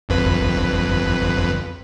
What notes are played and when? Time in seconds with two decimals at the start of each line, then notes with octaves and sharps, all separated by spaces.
0.09 G1 F2 B4